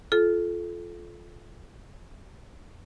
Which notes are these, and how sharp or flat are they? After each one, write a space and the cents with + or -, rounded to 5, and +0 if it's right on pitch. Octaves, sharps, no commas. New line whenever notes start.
F4 +0 A4 -25